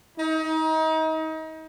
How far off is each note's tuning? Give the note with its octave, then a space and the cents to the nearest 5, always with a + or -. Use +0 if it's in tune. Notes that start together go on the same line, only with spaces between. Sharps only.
D#4 +30